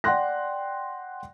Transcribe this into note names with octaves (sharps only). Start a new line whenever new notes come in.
D5 F#5 G5 C6 F#6 A#6